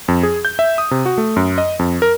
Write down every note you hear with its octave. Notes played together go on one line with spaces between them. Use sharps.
F2
G#4
G6
E5
D#6
C3
F#4
A3
F#2
D#5
F2
A#4